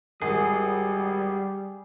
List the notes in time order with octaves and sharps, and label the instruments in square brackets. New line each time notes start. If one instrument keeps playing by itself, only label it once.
[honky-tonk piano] G#1 [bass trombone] G3 [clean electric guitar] G#4